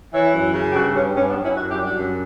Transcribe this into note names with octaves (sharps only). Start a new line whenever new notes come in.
E3 C#5 E5
F#2
C#3
G4
G2 F#4 A4
G2 C#4
G2 C#4
B3 D4
F#3
C#4 E4
F#2 D4 F#4
E4 G4
G3
D4 F#4
F#2